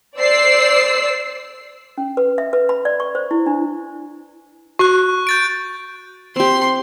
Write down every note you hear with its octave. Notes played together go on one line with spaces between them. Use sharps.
C5 D5 E6 C7
C#4
B4
E5
B4
B5
D5
C#6
C5
E4
D4
F#4 C#6 F#6
G6 A6 D7
C4 G4 C6